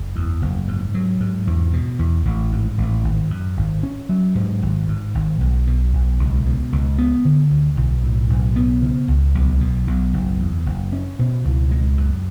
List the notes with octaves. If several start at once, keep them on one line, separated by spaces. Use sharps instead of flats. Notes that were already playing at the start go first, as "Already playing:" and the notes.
Already playing: F#1
E2
F#1
G#2
F#3
G#2
E2
B2
E2
A1
G#2
A1
G#1
F#2
G#1
C#4
F#3
G#2
G#1
G#2
G#1
B1
B2
B1
C#2
B2
C#2
B3
D3
D2
B1
A2
B1
B3
C#3
C#2
B1
B2
B1
F#1
E2
F#1
C#4
B2
C#2
G#3
F#2